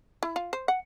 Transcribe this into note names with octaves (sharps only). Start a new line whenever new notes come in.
E4
F4
C5
F#5